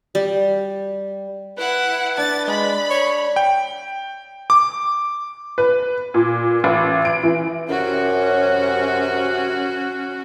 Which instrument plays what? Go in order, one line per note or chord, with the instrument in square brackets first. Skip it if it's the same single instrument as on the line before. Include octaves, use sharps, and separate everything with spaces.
[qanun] G3
[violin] E4 F#5 [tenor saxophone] B4
[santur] D4 [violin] A6
[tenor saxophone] G#3 [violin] B5
[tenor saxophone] C#5
[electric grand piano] G5
D6
[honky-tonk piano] B4
A#2
A1
D7
E3
[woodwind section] F#2 C3 [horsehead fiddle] C#4 F#4